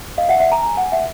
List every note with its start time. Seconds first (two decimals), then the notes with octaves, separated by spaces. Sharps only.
0.18 D#5 F5
0.29 E5 F#5
0.40 E5 F#5
0.52 G#5 A#5
0.63 G#5 A#5
0.77 F#5 G#5
0.92 E5 F#5